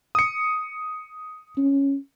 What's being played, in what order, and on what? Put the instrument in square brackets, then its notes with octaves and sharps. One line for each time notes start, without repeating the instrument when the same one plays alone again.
[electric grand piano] D#6 C#7
[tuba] C#4